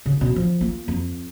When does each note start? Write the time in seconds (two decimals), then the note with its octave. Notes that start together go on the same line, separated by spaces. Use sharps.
0.06 C#3
0.21 B2 C#4
0.36 F3
0.61 A#3 F4
0.88 F2